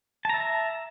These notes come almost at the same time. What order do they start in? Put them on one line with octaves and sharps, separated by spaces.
A5 A#5 E5